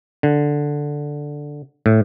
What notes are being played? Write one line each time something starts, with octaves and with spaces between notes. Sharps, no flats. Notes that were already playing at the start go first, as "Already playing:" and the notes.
D3
A2